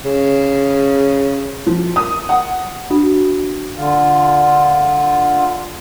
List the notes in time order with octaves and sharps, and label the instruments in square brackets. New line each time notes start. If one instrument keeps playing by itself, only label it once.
[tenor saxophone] C#3
[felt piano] F3
D#6
F#5
[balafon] D4 F#4
[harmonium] D3 F4